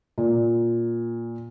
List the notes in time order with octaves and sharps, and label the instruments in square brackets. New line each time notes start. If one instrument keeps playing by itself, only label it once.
[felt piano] A#2